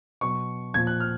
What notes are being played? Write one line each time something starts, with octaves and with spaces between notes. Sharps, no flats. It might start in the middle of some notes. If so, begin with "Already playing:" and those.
B2 F#3 C#6
A#2 F3 G#6
F#6
F6